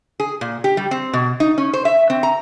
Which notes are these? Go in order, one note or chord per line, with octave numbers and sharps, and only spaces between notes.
G#4
A#2
G4
G3
C4
B2
D#4
C#4
C5
E5
C4
A#5